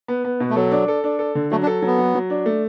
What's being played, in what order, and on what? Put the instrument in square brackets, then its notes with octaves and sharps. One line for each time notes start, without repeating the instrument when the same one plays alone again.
[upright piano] B3
B3
B2
[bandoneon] A3
[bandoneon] F#3 [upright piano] A4
[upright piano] D4
A4
D4
A4
D3
[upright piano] F#3 [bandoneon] A3
[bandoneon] D4
[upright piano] A4
[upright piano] F#3 [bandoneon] B3
[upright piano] F#3
F#3
D4
A3